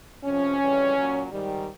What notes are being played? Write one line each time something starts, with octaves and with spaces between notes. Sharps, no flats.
F2 C3 F3 C#4
F2 C#3 E3 G3
A#2 F#3
G#2 D#3 G3